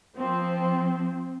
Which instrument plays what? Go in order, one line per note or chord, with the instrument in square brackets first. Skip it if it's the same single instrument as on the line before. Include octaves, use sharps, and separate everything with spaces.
[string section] F3 C4